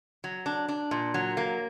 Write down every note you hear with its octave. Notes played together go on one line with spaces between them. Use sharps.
F#3
D4
D4
A#2
F#3
A#3